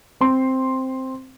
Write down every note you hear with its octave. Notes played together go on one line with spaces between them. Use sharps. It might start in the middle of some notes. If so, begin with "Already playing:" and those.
C4 C6